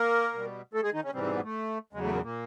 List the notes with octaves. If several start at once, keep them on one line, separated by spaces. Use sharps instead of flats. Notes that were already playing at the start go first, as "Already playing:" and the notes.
Already playing: A#3 A#4
B2 G3
A3 A4
G#3 G#4
D#3 D#4
C#3 C#4
G#2 C3 E3 G3 C4
C3 C4
B2 B3
A3
E2 C#3 F#3 G#3
A3
A#2 A#3
A#2 A#3